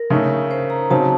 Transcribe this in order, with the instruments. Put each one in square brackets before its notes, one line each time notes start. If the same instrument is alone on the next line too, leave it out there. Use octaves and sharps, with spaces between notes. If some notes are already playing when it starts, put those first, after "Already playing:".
Already playing: [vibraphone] A#4
[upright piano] C#3 A3 D#4
[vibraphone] C5
A#5
[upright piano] C#3 F#3 C4 D#4 [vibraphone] A5